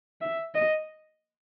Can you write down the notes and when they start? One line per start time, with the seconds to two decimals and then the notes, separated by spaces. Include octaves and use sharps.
0.21 E5
0.55 D#5